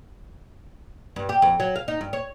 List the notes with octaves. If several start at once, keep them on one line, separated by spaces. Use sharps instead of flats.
G2
G4
F2
F#3
F5
D#4
G2
C#5